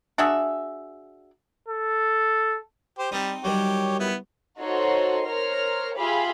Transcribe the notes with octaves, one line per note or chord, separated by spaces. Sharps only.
D4 F#4 G#4 E5
A4
G4 C5
G3 C4 D#4
D#3 F#3 G3 G4 C#5
B3 E4
D#4 F#4 A4 C5 C#5 C6
A#4 C5 C#5 A#5 F6
F4 G4 G#4 E5 F5 B5